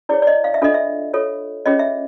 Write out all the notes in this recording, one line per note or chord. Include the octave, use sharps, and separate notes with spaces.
E4 G#4 C#5 D5
D5
D#5
F5
E5
D4 F4 A4 D#5
E5
F4 A4 C#5
C#4 F4 G#4 C#5 D#5
E5